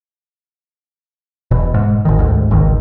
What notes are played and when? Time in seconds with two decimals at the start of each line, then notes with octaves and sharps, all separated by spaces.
1.51 E1 B2
1.74 G#2
2.05 G#1 D#3
2.19 D2 G#2
2.51 G#1 C#2 D#3